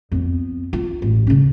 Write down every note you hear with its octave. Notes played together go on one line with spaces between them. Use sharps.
F2 B3
F4
A1
C#3 C#4